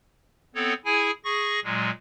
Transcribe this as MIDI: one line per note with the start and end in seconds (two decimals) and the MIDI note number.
0.55 0.74 59
0.55 0.74 60
0.55 0.74 69
0.55 0.74 73
0.85 1.11 64
0.85 1.11 68
0.85 1.11 80
1.24 1.60 68
1.24 1.60 85
1.24 1.60 94
1.64 1.91 46
1.64 1.91 54
1.64 1.91 56